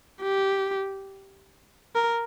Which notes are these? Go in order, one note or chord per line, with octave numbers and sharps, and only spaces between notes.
G4
A#4